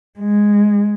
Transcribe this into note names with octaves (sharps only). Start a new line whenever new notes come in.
G#3